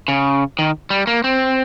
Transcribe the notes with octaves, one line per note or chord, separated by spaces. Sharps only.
C#3
D#3
G3
A#3
C4